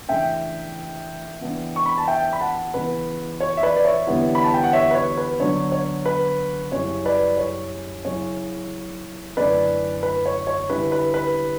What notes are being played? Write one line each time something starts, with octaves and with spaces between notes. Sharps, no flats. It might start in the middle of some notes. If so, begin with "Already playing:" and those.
C#3 E3 A3 D4 E5 G5
C#3 E3 B3 D4
C#6
B5
A5
E5 G5
B5
F#5 A5
C#3 E3 B3 B4
C#5
E5
B4 D5
D5
C#5 E5
E2 D3 G3 B3 E4
B5
A5
G5
F#5
C#5 E5
B4
C#5
B4
D3 F#3 B3 D4 C#5
C#5
B4
F#2 C#3 G3 C#4 E4 C#5
B4 D5
C#5
C#3 F#3 C#4 E4 C#5
F#2 D3 A3 C#4 E4 B4 D5
B4
C#5
C#5
D3 G3 C#4 E4 B4
B4
B4